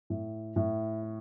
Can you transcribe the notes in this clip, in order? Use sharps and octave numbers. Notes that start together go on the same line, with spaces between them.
A2
A2
E4